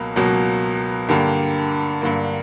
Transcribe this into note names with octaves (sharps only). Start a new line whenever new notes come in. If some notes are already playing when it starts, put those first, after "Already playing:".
Already playing: C#2 B2 F#3 A#3
C#2 B2 F#3 A#3
G2 D3 A#3 G4
G2 D3 A#3